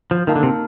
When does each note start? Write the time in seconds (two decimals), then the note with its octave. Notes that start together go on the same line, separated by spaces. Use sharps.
0.11 F3
0.27 D#3 A#3 D#4 A#4 F5 A5
0.36 D3
0.43 C3